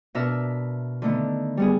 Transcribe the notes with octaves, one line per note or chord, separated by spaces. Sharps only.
B2 B3 D4 A#4 E5 F6
D3 D#3 A3 B3
G3 B3 G#4